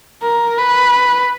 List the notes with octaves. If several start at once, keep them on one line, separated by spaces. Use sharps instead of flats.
A#4
B4